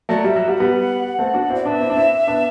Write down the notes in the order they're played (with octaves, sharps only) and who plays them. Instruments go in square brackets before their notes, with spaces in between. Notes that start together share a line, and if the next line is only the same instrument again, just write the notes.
[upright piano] F#3 A3 [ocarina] D5
[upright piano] G3 [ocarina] E5
[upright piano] F#3
[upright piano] G3 [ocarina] F#5
[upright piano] G3 B3
A3 C4
D4 F#4
[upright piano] C4 E4 [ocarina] D5
[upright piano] B3 D4 [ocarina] E5
[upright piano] C4 E4
D4
C4 E4
B3 D4